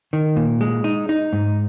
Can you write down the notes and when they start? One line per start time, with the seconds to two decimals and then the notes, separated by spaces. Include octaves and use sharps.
0.13 D#3
0.36 A#2
0.61 G#3
0.84 D#4
1.09 D#4
1.33 G#2